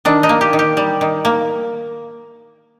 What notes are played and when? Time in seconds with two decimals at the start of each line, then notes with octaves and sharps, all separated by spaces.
0.05 D#3 D4
0.23 D#4
0.29 A#3
0.41 G4
0.53 D#3
0.59 G4
0.77 G3
1.01 D#3
1.25 A#3